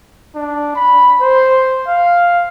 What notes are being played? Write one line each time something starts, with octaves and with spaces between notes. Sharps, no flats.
D4
B5
C5
F5